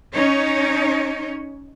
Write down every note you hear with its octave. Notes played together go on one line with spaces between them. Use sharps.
C#4 D#4 C#5